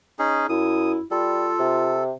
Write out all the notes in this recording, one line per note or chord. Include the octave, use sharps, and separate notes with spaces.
C#4 D#4 G#4
F#2 E4 D#6
G3 F4 A4
C3